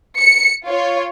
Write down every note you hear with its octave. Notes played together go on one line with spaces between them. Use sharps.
C#7
F4 C#5